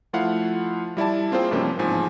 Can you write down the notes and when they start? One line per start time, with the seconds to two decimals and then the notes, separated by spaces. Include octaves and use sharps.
0.13 F3 A3 E4 F4 F5 F#5
0.97 G3 E4 D5 A5
1.31 A#3 C4 F4 G#4 C5 G5
1.51 G2 C3 F3 A#3 C#4
1.78 A1 G#2 F3 G#5